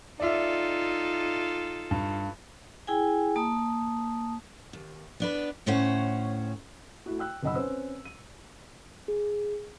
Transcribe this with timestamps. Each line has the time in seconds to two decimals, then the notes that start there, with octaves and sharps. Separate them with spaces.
0.20 D#4 F4 A4 D5 E5
1.91 G2
2.87 E4 G#4 G5 G#5
3.36 A#3 A5 D#6
4.73 D#2
5.20 B3 D4 B4
5.66 D2 A2 C#4 C5 C#5 F#5
7.06 A3 E4 F#4
7.19 G5 E6 F#6
7.43 F#1 B1 D#5 F#5 B5 E6
7.55 C4 C#4 B4 C5 E6
8.05 D#7
9.08 G#4